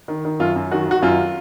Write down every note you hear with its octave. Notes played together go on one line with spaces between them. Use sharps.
D#3
D#3
F#2 F4
F#2
D#3 F#4
D#3 F#4
F#2 F4